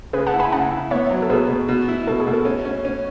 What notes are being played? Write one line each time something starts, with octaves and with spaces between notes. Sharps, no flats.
C#3 G#4 B4
F#5 A5
E4
G#5 B5
C#3 F#5 A5
E4
B3 C#5 E5
F#3
A4
B2 G#4 B4
B2
B2
E4
B2 A4
G#4
B2
A4
C#4
C#4
C#4